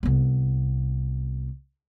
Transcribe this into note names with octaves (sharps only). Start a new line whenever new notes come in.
C2 B3